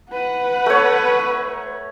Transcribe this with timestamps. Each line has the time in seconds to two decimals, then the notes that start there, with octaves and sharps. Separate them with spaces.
0.11 B4 F#5
0.66 A3 C#5